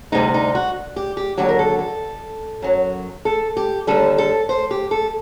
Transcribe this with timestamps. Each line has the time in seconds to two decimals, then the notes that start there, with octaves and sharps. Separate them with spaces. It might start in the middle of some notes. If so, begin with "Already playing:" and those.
0.12 D2 C3 G3 D#4
0.34 D#4
0.55 F#4
0.96 G4
1.17 G4
1.37 D#2 D3 F#3 G4
1.49 A#4
1.59 A4
1.79 A4
2.62 F#2 F#3
3.25 A4
3.57 G4
3.87 D#2 D3 G3 A4
4.18 A4
4.49 C5
4.71 G4
4.91 A4